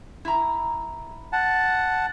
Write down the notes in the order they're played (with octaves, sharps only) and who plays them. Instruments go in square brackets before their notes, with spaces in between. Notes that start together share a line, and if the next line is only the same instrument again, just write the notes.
[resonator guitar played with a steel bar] E4 A#5
[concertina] F#5 A5